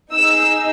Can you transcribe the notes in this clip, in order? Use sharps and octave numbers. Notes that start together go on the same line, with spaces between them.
D#4 G#4 E6